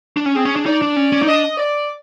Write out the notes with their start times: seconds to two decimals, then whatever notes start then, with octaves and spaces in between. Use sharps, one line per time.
0.17 D4
0.26 C#4
0.35 C4 G#4
0.45 C#4
0.56 D4
0.66 D#4 D5
0.82 D4
0.96 C#4
1.12 C#4
1.22 D#4
1.27 D4 D#5
1.58 D5